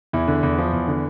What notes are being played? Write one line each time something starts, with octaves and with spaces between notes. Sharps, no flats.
E2 E4
D3
E2
F3
E2
D3